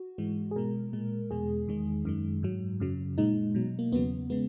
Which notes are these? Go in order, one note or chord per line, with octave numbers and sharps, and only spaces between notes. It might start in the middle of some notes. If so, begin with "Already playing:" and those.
Already playing: F#4
G#2 E3 G#3
G#4
B2 G#3 A#4
A#2 G#3
E2 B2 G#3 G#4
E2 D#3 G#3
F#2 D#3 G#3
G#2 F#3
F#2 C#3 F#3
A#2 G#3 D#4
B2 F#3
A#3
E2 C#3 F#3 B3
C#3 G#3 B3